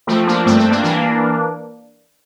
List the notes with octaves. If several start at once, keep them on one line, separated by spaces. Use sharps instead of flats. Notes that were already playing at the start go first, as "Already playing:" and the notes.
F3 A3 C4
F3 A#3 D4
G2 A3 C4
A3 C4
G2
A#3 D4
E3 A#3 D4
E3